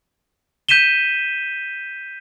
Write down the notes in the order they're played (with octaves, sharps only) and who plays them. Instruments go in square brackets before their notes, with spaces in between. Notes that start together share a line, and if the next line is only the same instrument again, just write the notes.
[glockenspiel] G6 B6 D#7 E7 G7